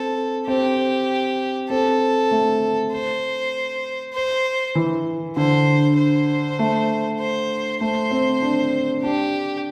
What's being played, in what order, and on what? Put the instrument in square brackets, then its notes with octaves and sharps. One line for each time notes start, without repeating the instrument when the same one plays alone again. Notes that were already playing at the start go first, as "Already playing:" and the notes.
Already playing: [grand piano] C4 [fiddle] A4
[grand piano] C4 [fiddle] G4
[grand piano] C4 [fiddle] A4
[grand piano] A3
[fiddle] C5
C5
[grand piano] E3
[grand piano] D3 [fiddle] C5
[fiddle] C5
[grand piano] A3
[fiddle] C5
[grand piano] A3 [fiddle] C5
[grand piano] C4
D4
[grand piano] D4 [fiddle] G4